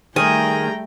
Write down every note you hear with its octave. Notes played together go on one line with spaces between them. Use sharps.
D#3 G3 A3 G#4 G5 A#5